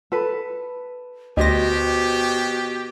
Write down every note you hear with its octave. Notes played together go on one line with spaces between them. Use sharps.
A4 B4
D2 B2 F#4 G4 C5 D#5 A#6